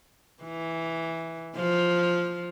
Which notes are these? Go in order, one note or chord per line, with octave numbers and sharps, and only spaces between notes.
E3
F3